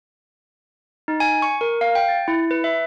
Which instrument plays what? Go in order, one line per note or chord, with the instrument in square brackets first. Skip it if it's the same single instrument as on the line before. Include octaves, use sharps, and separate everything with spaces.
[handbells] D#4
G#5
C#6
A#4
F5
G5
A6
E4
B4
E5